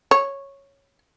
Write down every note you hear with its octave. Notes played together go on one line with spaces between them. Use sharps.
C#5